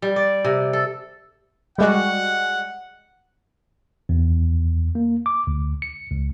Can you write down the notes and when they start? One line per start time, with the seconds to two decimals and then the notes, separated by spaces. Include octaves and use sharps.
0.02 G3
0.16 D5
0.45 C3
0.73 A4
1.78 G3 G#3 F#4 F#5
4.09 E2
4.95 A#3
5.26 D6
5.47 D2
5.82 C#7
6.11 C#2